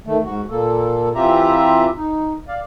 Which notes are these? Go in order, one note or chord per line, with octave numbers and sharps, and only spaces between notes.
D#3 A3
G#2 F#4
A#2 A#3 A4
E3 C4 F4 G4 E5 A#5
D#4
D5 F5